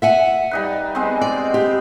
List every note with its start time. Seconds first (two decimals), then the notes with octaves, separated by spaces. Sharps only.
0.02 E5 F#5 G#5
0.51 G3 D#4 B4
0.95 G#3 B3 C4
1.21 D5
1.54 G4